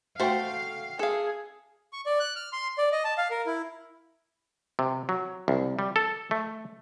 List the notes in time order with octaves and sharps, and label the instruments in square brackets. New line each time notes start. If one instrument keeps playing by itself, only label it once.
[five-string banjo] A3 C5 [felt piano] F#4 G5 [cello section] F5
[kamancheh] G#4 [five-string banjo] A4 F5
[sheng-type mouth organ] C#6
D5
F#6
F6
C6
D5
D#5
A5
F5
A#4
E4
[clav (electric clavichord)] C3
F#3
C2
G3
A4
A3